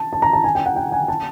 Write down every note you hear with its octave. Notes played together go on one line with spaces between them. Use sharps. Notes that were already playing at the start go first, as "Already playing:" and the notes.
Already playing: A5
A5
A#5
A5
G#5
G5
F#5
G5
G#5
A5